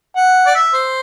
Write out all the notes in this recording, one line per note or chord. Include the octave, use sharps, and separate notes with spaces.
F#5
D5
E5
C5